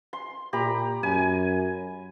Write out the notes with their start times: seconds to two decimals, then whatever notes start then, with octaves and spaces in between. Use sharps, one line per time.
0.13 C6
0.53 A#2 G4 A#5 B5
1.03 F#2 G#5